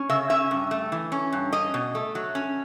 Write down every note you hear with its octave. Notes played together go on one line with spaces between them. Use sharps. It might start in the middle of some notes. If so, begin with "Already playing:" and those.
Already playing: C#4
C#3 E5
C#4 E5
G2
A3
E3
C#4
G2
C#4 D#5
B2
A3
F#3
C#4